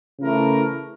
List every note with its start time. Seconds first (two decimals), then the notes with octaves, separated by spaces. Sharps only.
0.20 C#3 E3 A3 E4 A#4